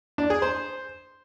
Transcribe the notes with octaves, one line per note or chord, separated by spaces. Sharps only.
D4
G#4
C5